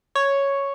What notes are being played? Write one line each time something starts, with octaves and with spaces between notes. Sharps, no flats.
C#5